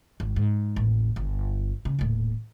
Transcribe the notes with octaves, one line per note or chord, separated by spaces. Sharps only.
G#1
G#2
A1 D#2
G1
C#3
D#1 A2